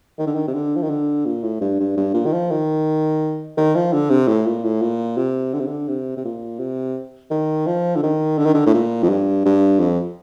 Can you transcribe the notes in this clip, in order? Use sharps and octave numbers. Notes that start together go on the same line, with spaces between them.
D#3
D3
D#3
C3
D3
F3
D#3
D3
A#2
A2
G2
G2
G2
A#2
D#3
F3
D#3
D#3
F3
D3
C3
A2
A#2
A2
A#2
C3
D3
C3
D3
C3
C3
A#2
C3
D#3
F3
D3
D#3
D3
D#3
D3
A2
A#2
F2
G2
G2
F2